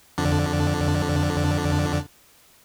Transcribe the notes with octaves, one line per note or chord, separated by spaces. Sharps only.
F2 D3 D4